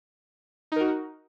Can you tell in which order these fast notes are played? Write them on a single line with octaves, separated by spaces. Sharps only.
D#4 A#4 F#4